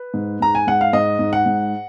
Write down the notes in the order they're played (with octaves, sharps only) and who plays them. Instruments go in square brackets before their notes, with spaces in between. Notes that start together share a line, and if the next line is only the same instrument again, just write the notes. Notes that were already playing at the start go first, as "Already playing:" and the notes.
Already playing: [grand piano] B4
G#2
G#2 A#5
G#5
G#2 F#5
F5
G#2 D#5
G#2
F#5
G#2